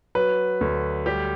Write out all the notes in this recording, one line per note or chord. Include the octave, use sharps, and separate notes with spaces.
F#3 B4
D2
G3 G4